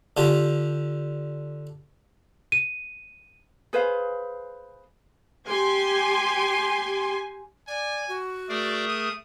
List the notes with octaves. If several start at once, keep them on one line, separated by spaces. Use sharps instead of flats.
D3 F4 G4
D#7
G#4 B4 C5 F5
G4 G#5 C6
D5 G#5
F#4
A3 G#4 A#4 D5
D#6